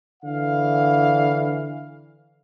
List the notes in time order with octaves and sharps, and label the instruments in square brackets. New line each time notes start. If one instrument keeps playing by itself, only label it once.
[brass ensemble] D3 E3 F5